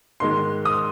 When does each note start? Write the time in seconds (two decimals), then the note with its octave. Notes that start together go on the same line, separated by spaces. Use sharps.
0.20 G#2 D#3 G#3 C6
0.65 D#6